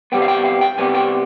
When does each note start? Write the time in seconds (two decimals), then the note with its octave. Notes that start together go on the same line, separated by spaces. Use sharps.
0.12 C3 G3 B3 G5
0.22 F5
0.28 G5
0.45 F5
0.61 G5
0.78 C3 G3 B3 G#5
0.94 G5